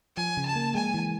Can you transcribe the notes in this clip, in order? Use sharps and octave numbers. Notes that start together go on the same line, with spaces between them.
F3 G#5
C#3
A5
A#3
G#3 G#5
E3